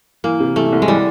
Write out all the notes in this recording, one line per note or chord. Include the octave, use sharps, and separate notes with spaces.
E3 A#3
C3
E3 A3
C2
G#3
E3 G3